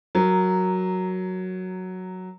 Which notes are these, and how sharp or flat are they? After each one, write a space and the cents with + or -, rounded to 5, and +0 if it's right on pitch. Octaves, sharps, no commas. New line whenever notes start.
F#3 +0 A#4 +0